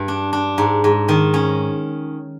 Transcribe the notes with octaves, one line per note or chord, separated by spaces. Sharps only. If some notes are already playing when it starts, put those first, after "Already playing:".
Already playing: G2
D4
D4
G#2
G#2
D#3
C#4